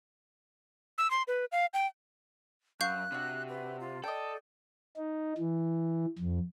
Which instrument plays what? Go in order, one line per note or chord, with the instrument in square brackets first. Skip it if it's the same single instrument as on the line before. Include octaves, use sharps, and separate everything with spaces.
[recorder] E6
C6
B4
F5
G5
[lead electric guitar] F#2 [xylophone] F5 C#6 G6 [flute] F#6
[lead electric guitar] C3 [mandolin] D4 F#4
[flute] B4
F4
[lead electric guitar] A4 [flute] D5 [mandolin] D#5 G5
[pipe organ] D#4
E3
F2